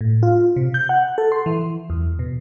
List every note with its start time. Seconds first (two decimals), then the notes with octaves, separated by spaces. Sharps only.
0.01 A2
0.23 F4
0.56 C3
0.74 G6
0.89 F#5
1.18 A4
1.32 C6
1.46 E3
1.90 E2
2.19 B2